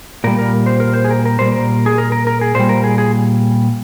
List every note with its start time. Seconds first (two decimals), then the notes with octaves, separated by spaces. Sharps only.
0.24 A#2 G3 A#4
0.39 A#4
0.66 C5
0.80 A#4
0.94 C5
1.05 G#4
1.11 A#4
1.25 A#4
1.39 A#2 G3 C5
1.52 A#4
1.86 G#4
1.98 A#4
2.12 A#4
2.27 A#4
2.41 G#4
2.55 A#2 G3 C5
2.69 A#4
2.84 G#4
2.98 G#4